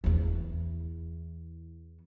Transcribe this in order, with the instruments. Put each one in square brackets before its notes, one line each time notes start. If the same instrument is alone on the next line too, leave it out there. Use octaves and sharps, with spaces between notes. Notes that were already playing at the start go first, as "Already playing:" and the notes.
[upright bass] E2 E3